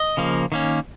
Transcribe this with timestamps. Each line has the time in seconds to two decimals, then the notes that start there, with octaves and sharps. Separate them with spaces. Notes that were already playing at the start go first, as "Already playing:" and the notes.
Already playing: D#5
0.17 C#3 F3 A#3
0.52 D#3 A#3 C#4